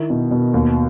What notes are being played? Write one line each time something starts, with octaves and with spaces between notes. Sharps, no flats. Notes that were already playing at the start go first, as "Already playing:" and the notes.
Already playing: D#3 E4
B2
B2
D#2